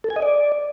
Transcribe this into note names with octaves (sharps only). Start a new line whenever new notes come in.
A4
G#5
D#5
D5